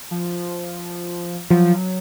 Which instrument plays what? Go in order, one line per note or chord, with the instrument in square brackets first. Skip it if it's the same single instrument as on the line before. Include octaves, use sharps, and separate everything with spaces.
[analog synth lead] F3
[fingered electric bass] F3 [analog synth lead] F#3